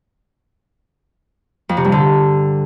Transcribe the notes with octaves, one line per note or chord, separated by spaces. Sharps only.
F2
C3
G2
D3